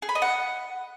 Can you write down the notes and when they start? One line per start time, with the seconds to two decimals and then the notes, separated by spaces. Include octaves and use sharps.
0.02 G#4
0.09 B5
0.15 D#5
0.22 F#5